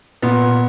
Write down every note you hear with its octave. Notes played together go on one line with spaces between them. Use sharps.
A#2 B3